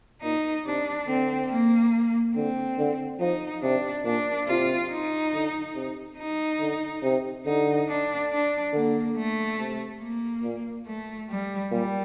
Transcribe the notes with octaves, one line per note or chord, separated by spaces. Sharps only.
A#2 D#4
C3 D4
D3 C4
A#3
D3 C4
D3
F3 D#4
C3 D4
A#2 D4
C3 F4
D#4
D3
C3
D#4
D3
C3
D3 D#4
D4
D4
D3 A#3
A3
C3
A#3
A#2
A3
G3
A#2 G3